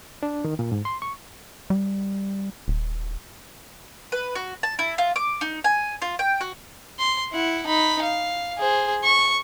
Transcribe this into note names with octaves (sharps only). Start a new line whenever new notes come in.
D4
D#3
A#2
G#2
C6
C#6
G3
D#1
B4
F#4
A5
E4
F4
D6
D#4
G#5
F4
G5
F#4
C6
E4 F#5
D#4 B5
F5
G#4 C5
C#6